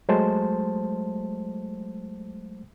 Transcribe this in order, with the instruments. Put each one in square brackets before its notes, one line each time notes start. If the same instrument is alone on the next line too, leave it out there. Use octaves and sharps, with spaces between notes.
[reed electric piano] F#3 G#3 A3 C5 A5